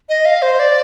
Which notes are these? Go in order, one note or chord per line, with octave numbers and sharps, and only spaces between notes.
D#5
F5
C5
D5